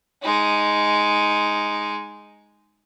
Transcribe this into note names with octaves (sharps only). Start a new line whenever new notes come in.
G#3 D#4